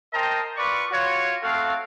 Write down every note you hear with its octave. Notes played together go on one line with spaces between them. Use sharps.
A#4 C5 D#5 G5 A5 A#5
F4 B4 D5 C#6
F4 F#4 C#5
A3 C4 F#4 A4 F5